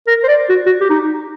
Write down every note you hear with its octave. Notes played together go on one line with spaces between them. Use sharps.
A#4
C5
D5
F#4
F#4
G4
D#4